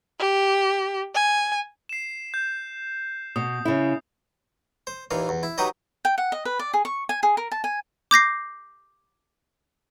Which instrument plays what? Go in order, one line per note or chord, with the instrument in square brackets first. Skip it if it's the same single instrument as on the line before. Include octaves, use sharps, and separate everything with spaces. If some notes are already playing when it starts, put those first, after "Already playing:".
[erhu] G4
G#5
[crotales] C7 E7
G6
[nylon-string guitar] B2 [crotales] D#6
[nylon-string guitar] C#3 E4
[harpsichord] C5
D#2 A#2 E3 F5
E2
E4
F#3 D#4 G4 B4 D#5
[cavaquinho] G5
F#5
D#5
B4
D5
G#4
C#6
G#5
G#4
A#4
A5
G#5
[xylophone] D6 G6 A#6 C7